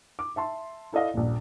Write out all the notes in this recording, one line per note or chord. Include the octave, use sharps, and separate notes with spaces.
D6
E5 A5 C6
E4 A4 D5 D#5 F5
D#1 A#1